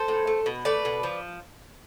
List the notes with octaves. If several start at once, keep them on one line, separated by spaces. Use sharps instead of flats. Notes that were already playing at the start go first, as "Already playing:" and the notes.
Already playing: A4 C5
A2
A3
B2
A3 B4 D5
B2
F3